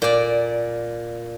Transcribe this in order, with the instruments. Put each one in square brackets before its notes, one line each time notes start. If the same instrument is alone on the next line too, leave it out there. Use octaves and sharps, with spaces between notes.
[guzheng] A#2 D5